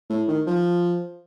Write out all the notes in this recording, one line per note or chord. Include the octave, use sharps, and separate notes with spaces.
A2
D#3
F3